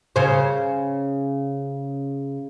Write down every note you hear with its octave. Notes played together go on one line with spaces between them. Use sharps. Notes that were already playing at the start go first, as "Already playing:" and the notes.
C#3 C5